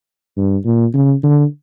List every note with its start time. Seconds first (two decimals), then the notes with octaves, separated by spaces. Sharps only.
0.37 G2
0.65 A#2
0.94 C#3
1.23 D3